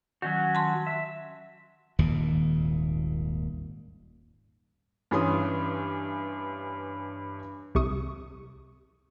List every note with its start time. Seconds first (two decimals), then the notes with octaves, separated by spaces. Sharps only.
0.22 D#3 F#3 C#4 F#4
0.55 A5 C6
0.87 E5
1.99 D#1 G#1 D#2 A#2
5.11 G2 E3 C#4 C6 D#6
7.75 C2 C3 C#6 D#6